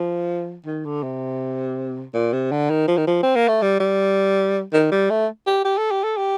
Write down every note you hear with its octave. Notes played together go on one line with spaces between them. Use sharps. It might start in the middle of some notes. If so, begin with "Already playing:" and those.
Already playing: F3
D#3
D3
C3
A#2
C3
D3
D#3
F3
D#3
F3
C4
A#3
A3
G3
G3
D#3
G3
A3
G4
G4
A4
G4
A4
G4